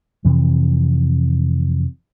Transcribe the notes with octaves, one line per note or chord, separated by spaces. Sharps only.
F2 C3 E3 C4